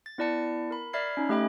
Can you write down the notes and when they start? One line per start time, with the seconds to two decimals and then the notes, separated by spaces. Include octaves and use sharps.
0.06 A6
0.18 B3 E4 D5 A5 C#7
0.71 A#4 B5
0.93 D5 E5 B5 F6 G#6 C7
1.17 C#4 D#4
1.29 A3 G4 D#5 G5 B5